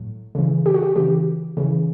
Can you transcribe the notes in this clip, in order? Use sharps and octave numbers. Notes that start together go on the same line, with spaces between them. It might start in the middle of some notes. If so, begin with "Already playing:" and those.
Already playing: A2 F#3
C#3 E3
G4
F#4
G4
C#3 E3 G4
C#3 E3